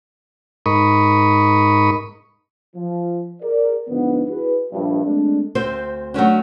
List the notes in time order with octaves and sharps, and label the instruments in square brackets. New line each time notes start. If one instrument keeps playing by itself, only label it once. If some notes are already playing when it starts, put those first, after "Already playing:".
[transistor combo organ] G#2 D#4 A#4 B5 C#6 D#6
[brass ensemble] F3
G#4 A#4 D5
F2 G#2 D3 B3
E4 F#4 G#4 B4
A#1 G2
G#3 A3 C4 D4
[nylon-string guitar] D2 C4 C5
F#3 A3 C#4 D4